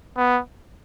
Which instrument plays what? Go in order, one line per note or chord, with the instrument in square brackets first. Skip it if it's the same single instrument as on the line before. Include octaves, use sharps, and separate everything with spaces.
[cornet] B3